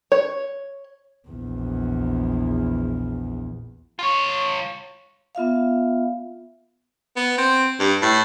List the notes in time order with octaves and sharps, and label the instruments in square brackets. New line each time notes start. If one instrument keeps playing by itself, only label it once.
[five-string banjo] C#5
[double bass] A#1 E2
[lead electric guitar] F4 C#5
[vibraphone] B3 F4 E5 F5
[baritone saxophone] B3
C4
G2
A2